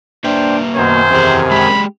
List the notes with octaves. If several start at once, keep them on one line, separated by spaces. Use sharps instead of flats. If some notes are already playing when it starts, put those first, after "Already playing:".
A#3 D4 B4 C5 E5 G5
F#2 B2 D#3 C5 G#5
E2 C3 G#4
G#3 G4 B5